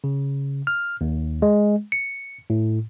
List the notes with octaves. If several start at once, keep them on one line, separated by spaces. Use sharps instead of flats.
C#3
F6
D#2
G#3
C#7
A2